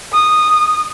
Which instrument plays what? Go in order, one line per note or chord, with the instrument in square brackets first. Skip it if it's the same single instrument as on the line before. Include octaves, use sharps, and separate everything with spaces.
[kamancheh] D#6